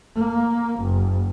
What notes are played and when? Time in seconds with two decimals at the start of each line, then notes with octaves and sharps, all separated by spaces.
0.16 A#3
0.81 F#1